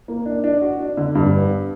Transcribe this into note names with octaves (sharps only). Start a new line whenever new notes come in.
A#3
D4
D4
F#4
D4
D3
G2
B3